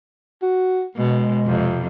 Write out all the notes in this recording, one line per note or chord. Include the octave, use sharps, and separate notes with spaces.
F#4
B2 G#3
F2 C3